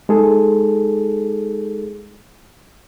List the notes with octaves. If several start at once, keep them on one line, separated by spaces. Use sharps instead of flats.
G#3 D#4 G#4 A4